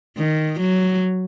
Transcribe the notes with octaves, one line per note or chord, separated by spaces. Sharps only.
D#3
F#3